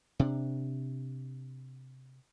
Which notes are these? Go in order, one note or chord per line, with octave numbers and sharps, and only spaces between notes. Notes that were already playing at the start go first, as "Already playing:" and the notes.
C3 D4